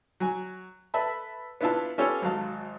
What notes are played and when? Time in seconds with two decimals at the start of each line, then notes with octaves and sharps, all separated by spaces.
0.20 F#3 G#5
0.94 A4 B4 E5 A5 B5
1.61 B3 D4 E4 F4 E5 A5
1.98 B3 C#4 F4 G4 A4 C#5
2.22 G#1 F#3 F5 A5